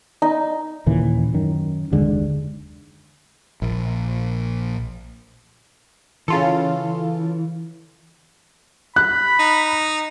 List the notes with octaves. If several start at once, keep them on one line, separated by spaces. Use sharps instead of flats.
D#4
D#2 A#2 C#3 E3
F#2 D#3
F#1 D#2 D3 G#3
A#1
C#3 E3 F4 A4
B5 F#6
D#4